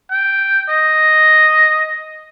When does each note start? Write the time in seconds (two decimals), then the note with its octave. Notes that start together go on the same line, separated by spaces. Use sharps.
0.11 G5
0.69 D#5